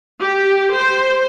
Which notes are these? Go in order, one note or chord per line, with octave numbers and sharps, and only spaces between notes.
G4
C5